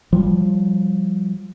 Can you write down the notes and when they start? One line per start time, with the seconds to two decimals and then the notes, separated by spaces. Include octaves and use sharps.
0.13 F3 G3